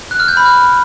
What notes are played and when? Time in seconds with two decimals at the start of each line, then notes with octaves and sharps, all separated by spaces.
0.11 F#6
0.20 F6
0.28 G6
0.37 B5
0.46 F6